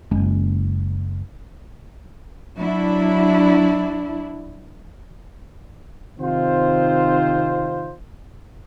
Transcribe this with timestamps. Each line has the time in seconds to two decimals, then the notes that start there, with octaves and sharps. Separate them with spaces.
0.11 F#1 G#3 C#4
2.58 F#3 D4 E4
6.19 C3 D#3 C4 D#4 F4 C5